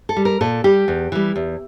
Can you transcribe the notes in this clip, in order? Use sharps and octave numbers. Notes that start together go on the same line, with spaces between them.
A4
G3
A#4
A#2 A4
G3 G4
E2
E3 G3
E2